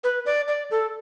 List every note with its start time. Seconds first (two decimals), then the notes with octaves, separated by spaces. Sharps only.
0.04 B4
0.26 D5
0.48 D5
0.71 A4